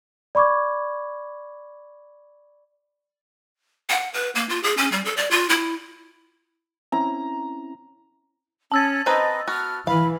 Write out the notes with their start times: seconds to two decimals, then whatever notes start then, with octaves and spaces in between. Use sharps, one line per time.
0.35 D5 B5 C#6 D6 G#6
3.89 F#5
4.14 B4
4.35 A#3
4.49 F4
4.63 G#4
4.77 C#4
4.92 G3
5.05 A4
5.17 D5
5.31 F4
5.49 E4
6.92 C4 C#4 E4 A#5
8.72 C#4 A5 E6 A6
9.06 C4 D#4 B4 D#5
9.48 B3 F#4 F6
9.87 E3 F5 B5